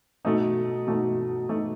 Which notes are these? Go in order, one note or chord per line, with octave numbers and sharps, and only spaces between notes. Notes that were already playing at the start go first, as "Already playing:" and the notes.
B2 A3 D#4
B2 A3 D#4
B2 A3 D#4